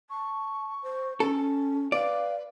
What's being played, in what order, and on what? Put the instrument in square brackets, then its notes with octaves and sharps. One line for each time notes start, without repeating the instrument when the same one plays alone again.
[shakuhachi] A5 [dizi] C#6
[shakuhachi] C5
[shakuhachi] C#4 [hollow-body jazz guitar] A4
[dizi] B4 [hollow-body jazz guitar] D5 [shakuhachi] F5